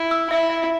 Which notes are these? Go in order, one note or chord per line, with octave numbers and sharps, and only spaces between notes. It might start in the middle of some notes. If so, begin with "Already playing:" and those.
Already playing: E4
E6
E4 E5
E5